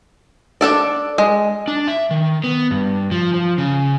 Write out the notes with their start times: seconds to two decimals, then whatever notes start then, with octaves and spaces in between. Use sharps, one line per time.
0.61 D4 A4 D5
1.18 G#3
1.68 D4
1.88 E5
2.11 D#3
2.44 B3
2.71 G2
3.11 F3
3.34 F3
3.58 C#3